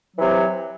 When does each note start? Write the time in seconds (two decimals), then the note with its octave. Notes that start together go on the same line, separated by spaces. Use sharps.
0.15 F#3
0.18 E3
0.22 C3